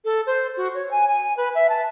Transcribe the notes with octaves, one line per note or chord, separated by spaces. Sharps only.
A4
C5
F#4
C#5
G#5
G#5
B4
E5
A5